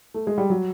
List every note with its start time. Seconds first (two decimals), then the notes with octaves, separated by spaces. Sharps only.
0.14 A3
0.27 G#3
0.38 G3
0.50 F#3